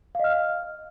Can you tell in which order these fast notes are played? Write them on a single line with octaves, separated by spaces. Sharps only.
F5 D#5 F6